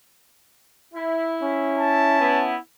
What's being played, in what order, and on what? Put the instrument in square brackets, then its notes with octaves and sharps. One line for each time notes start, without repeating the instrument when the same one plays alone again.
[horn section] E4
[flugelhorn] C#4
[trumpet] A5
[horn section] B3 E4